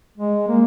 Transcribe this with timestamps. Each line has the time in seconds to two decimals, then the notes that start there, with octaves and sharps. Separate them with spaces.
0.18 G#3
0.48 A#3